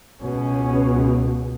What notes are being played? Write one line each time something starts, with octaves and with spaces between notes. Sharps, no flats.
C#2 B2 C#4